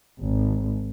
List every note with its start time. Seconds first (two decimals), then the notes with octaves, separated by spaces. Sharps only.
0.22 G#1